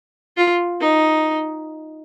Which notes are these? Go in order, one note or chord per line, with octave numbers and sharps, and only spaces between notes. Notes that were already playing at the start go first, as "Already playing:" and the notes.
F4
D#4